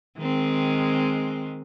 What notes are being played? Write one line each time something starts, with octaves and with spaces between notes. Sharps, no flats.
D#3 G#3 C4